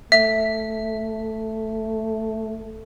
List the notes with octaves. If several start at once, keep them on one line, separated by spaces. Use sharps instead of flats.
A3 E5